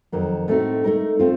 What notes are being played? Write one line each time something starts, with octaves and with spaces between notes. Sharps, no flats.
F2 D#3 F#3 A#3
A2 A3 C4 D#4 F#4
A3 D#4 A#4
A3 C4 F4